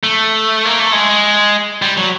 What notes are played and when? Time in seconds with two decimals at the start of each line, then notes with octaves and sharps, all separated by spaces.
0.03 A3
0.65 A#3
0.79 A3
0.92 G#3
1.82 G3
1.97 F#3